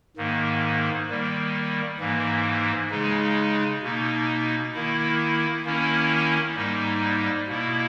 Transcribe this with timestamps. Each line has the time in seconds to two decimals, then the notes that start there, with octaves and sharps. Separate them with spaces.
0.17 G#2 D#3 A#3
1.09 D#3 G3 A#3
2.00 G#2 E3 A#3
2.91 C#3 G#3 D#4
3.82 B2 A#3 D#4
4.74 D#3 A#3 E4
5.65 D#3 A#3 C#4 E4
6.56 G#2 G3 A#3 D#4
7.48 B2 A#3 E4